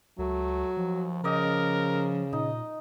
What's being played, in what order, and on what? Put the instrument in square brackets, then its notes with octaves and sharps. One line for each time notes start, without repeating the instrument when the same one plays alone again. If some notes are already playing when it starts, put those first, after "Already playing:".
[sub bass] C#2 [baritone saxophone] F#3 [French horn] A3
[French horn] D#2 [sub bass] F3
[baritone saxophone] C#3 [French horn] A#4 [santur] D5 D#5 G5
[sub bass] A#2 [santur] D#4 [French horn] D#5